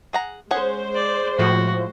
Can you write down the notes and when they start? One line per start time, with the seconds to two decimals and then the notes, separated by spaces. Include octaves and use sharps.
0.13 G#4 F#5 A#5
0.51 G#3 C#4 G#4 C5 F#5
0.95 D5
1.39 A2 F3 F#4